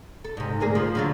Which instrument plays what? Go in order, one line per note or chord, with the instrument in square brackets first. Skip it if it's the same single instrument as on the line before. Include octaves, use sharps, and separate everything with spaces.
[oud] A4
G#2 C3
D2 A#3 G#4
F3
D3 F#3 F4